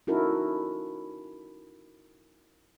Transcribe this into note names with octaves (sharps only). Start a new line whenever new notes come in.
C#4 D#4 E4 F#4 A4 A#4